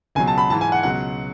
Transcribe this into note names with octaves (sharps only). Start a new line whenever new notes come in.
C#2 B2 F#3 G#5
A5
B5
G#2 E3 A5
G#5
F#5
C#2 B2 F#3 F#5